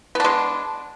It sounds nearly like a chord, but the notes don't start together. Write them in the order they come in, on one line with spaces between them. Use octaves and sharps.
B3 D4 G#3